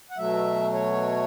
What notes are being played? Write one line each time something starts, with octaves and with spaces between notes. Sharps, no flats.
F#5
B2 F#3 A3 E5
C#5